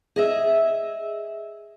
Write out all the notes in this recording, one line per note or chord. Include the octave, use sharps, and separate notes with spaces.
G#4 D#5 E5